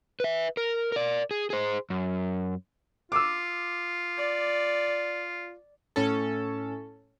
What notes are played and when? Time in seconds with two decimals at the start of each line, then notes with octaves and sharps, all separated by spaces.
0.20 B4 E5
0.57 A#4
0.92 A#4 D5
1.31 G#4
1.50 G#4 C5
1.90 F#2
3.12 F4 D6 E6
4.18 D5
5.96 A2 C#4 A4